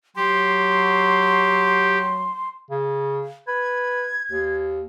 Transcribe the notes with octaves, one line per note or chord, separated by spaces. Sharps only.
F#3 G4 C6
C#3
B4 G#6
D#2